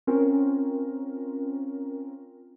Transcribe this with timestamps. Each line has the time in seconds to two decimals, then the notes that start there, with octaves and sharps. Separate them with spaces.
0.07 C4 C#4 F4 A#4